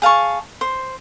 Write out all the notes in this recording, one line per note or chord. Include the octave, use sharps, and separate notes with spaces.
G#4 F5 A5 C#6
C5